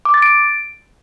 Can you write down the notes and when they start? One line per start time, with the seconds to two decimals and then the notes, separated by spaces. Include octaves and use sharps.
0.05 D6
0.14 A6
0.22 D7